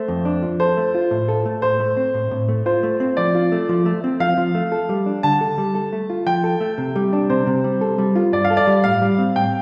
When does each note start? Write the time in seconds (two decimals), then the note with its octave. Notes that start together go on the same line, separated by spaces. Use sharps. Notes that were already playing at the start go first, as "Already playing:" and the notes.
Already playing: A3 C5
0.08 F2
0.25 D4
0.42 F3
0.60 A4 C5
0.77 A3
0.95 F4
1.11 A2
1.28 A4
1.45 A3
1.62 A2 C5
1.80 A3
1.97 C4
2.14 A2
2.31 A2
2.48 A3
2.66 F4 C5
2.83 A3
3.00 C4
3.17 F3 D5
3.35 F4
3.52 A3
3.69 F3
3.86 A3
4.04 C4
4.20 F3 F5
4.37 F3
4.55 A3
4.72 A4
4.89 G3
5.06 D4
5.23 D3 A5
5.41 A4
5.58 G3
5.75 A4
5.92 A3
6.10 F4
6.27 F3 G5
6.44 A4
6.60 A3
6.78 C3
6.96 G3
7.13 D4
7.30 C3 C5
7.47 C3
7.64 G3
7.81 A4
7.98 G3
8.16 F4
8.33 G2 D5
8.45 F5
8.50 A4
8.57 D5
8.67 G3
8.84 A2 F5
9.01 G3
9.18 C4
9.36 A2 G5